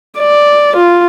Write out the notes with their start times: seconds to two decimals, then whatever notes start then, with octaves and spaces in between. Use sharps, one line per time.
0.19 D5
0.77 F4